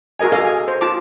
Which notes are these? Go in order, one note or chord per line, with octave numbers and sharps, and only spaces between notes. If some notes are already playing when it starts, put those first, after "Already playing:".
F#4 G#4 A#4 D#5 G#5
G#4 A4 D#5 F5
G#5
C5
F4 A5 D6